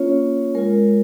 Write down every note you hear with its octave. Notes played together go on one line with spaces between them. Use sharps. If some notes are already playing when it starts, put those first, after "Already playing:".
Already playing: A#3 C#4 F4 C#5
G#3 F4 A#4